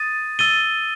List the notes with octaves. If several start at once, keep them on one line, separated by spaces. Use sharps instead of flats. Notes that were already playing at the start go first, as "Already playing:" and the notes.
Already playing: D#6 A6 D#7
E6 A6 D#7 G7